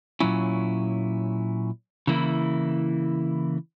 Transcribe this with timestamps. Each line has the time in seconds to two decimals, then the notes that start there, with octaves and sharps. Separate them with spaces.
0.20 A#2 F#3 C#4 E4
2.07 C#3 E3 A#3 E4